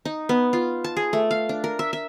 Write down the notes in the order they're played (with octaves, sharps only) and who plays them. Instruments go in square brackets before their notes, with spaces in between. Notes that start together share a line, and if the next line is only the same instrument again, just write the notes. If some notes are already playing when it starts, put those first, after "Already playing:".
[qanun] D#4
B3
F4
A5
G#4
A3
F5
D4
A#4
E5
E5